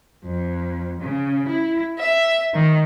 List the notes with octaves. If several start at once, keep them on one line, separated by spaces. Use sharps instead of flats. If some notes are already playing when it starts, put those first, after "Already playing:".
F2
C#3
E4
E5
D#3